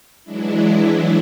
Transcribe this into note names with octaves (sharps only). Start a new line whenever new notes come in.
E3 F#3 G#3 D4 E4